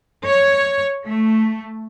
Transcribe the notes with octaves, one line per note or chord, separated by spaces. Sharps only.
C#5
A3